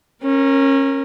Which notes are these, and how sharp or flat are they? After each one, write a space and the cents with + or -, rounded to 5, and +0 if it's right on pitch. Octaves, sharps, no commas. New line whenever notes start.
C#4 -25 A#4 +0